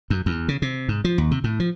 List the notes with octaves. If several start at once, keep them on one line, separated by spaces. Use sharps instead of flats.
F#2
E2
C#3
C3
G#2
F3
D#2
C3
A2
F3